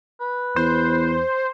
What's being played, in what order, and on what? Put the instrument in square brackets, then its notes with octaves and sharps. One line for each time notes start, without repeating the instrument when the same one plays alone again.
[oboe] B4
[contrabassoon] E2 [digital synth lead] C5